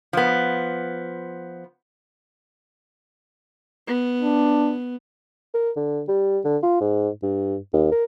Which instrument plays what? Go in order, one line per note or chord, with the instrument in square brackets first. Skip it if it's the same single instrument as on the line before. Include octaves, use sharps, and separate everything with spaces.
[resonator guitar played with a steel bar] F3 B3
[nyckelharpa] B3
[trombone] D4
[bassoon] A#4
D3
G3
D3
F4
G#2
G2
D#2
A#4